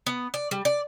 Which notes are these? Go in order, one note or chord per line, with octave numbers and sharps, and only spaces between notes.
B3
D5
G3
D5